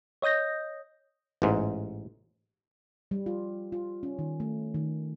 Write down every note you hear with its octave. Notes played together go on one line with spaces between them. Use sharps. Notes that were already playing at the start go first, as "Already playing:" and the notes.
C#5 D#5 D#6 G6 A#6
A1 G#2
G3
F4
F4
C#4
D#3
A3
D#3